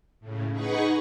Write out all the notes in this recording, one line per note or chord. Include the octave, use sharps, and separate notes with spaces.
A2 C#3
D#4 G#4 B4 F#5 C#6